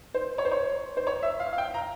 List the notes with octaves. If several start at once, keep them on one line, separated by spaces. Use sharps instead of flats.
C5
C#5
C5
C#5
C5
C#5
E5
F5
F5
G5
A#5